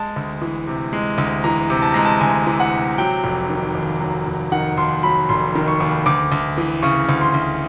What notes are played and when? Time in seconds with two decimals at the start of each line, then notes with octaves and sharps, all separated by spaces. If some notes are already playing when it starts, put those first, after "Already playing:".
Already playing: G#3 A5
0.16 D2
0.42 E3
0.67 C3
0.93 G#3
1.18 D2
1.44 E3 A#5
1.70 C3
1.82 A5
1.94 G#3 A#5
2.05 A5
2.20 D2 G#5
2.47 E3
2.60 F#5
2.73 C3
2.98 F#3 G5
3.24 F1
3.49 D#3
3.75 D#2
4.01 F#3
4.26 F1
4.52 D#3 F#5
4.78 D#2 C6
5.03 F#3 B5
5.29 F1 C6
5.55 D#3
5.68 C#6
5.80 D#2
6.06 D2 D6
6.32 D2
6.57 E3
6.83 C#3 C#6
7.09 D2
7.21 C6
7.34 D2